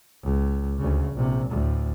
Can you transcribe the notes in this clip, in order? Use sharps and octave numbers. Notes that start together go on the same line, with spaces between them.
C#2
D2 C#3
A#1 C3
D2 A2